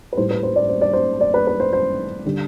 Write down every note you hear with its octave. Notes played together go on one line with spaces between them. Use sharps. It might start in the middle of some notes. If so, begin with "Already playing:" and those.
B4
A2 G3 C5
B4
C5
D5
C5
D5
C5
D5
B4
B4
C5
C5
D3 G3